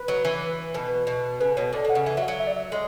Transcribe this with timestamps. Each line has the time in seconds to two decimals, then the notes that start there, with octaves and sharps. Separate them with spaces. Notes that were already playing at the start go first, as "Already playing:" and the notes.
Already playing: B4
0.08 F#3
0.25 E3
0.74 B2 B4
1.07 B2
1.40 C#3 B4
1.57 B2 C#5
1.73 A2 D5
1.85 B2 F#5
1.95 C#3
2.06 E3 E5
2.17 F#3 E5
2.23 F#5
2.28 F#3
2.40 E5
2.47 D5
2.56 E5
2.72 G#3